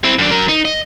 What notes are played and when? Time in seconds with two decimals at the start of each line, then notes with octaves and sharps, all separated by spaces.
0.04 C4 E4
0.18 F#2 D4
0.31 F#3 A#4
0.49 D#4
0.65 D#5